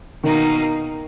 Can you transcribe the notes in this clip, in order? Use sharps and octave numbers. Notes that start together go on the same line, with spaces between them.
B2 D#3 A#3 D#4